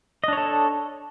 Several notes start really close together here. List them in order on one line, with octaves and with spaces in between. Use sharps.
D#5 D4 C#5 A4